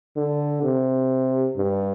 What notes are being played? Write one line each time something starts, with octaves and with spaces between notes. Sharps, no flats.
D3
C3
G2